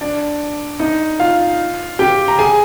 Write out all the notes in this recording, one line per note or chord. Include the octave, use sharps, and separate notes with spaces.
D4 D5
D#4 D#5
F4 F5
G4 G5
A#5
G#4 G#5